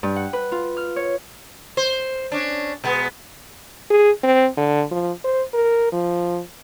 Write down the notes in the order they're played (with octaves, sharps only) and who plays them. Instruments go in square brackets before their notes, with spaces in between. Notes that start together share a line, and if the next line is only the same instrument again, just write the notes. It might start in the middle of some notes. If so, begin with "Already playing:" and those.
[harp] G2
F#5
B4
F4
F6
C#5
[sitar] C5
C#4 D4
B2 G#3 B3
[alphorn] G#4
C4
D3
F3
C5
A#4
F3